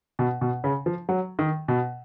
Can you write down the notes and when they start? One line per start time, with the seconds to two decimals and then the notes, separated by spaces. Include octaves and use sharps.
0.19 B2
0.41 B2
0.64 C#3
0.86 F3
1.09 F#3
1.39 D#3
1.68 B2